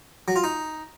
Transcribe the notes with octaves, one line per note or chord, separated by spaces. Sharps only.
F#3
F4
D#4